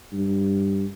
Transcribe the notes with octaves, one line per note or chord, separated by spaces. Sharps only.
G2